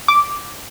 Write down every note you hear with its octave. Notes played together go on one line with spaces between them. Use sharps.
D6